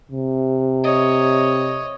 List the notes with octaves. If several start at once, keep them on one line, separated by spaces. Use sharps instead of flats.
C3
C#5 D#5